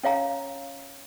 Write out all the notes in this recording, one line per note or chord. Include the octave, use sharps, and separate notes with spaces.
C#4 C#5 F5 A#5